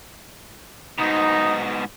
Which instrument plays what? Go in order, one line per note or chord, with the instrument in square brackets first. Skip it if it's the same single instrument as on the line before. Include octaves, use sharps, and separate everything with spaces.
[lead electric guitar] G#2 B2 [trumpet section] D#4